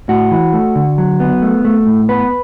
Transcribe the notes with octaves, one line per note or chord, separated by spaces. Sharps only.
A2 F#4
E3
A3
D3
F#3
B3
A3
A3
A2
B3 B4